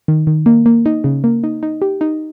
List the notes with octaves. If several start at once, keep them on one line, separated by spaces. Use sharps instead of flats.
D#3
D#3
A#3
A#3
D#4
C#3
A#3
D#4
D#4
G4
D#4